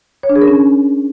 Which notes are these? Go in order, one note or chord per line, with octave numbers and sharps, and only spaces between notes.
C#5
D4
G#4
A#4
C#4